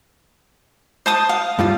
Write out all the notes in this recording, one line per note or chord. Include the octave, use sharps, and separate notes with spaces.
C5 A5 D#6
F5
G2 G3 F4